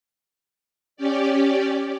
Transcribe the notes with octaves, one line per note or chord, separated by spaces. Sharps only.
C#4 G4 D5